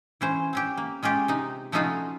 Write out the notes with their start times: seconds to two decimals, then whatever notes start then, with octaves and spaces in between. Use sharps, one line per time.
0.21 E3 C#4 C5
0.53 C4 C#4 G4
0.77 A#3
1.03 G#3 C#4 F4 G4
1.28 C3 D#4
1.72 F3 A3 C#4 D#4 F4 F#4